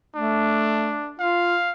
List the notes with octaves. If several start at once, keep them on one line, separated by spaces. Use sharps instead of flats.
A3 D4
F4 F5